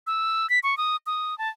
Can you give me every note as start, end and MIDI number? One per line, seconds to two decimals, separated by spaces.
0.07 0.49 88
0.50 0.59 95
0.63 0.77 85
0.78 0.96 87
1.06 1.37 87
1.38 1.49 81